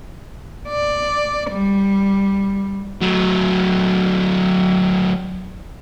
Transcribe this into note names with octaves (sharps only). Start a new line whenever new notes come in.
D5
G3
F#3 A3